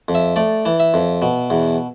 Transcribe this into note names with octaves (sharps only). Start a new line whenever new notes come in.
F2
E5
A3 D5
E3
E5
F2
B2
E2